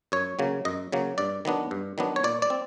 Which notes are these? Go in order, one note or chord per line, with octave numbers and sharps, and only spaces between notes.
F#2 C#5
C#3 F#3 A#3
F#2 D#5
C#3 F#3 A#3
G2 D5
D#3 F#3 B3 D4
G2
D#3 F#3 B3 D4
C#5
A#2 D5
D5
C4